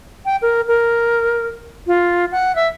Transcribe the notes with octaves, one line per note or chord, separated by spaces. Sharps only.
G5
A#4
A#4
F4
F#5
E5